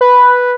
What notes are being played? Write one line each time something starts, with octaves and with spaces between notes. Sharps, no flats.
B4